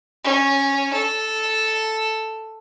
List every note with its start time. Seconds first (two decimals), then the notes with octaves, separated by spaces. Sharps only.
0.24 C#4
0.93 A4